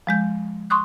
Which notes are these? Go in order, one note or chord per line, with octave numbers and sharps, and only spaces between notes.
F3 G#3 G6
C6 C#6 D#6 F#6